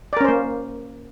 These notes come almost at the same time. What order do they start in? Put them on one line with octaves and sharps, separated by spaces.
D5 A#4 C#4 C5 A#3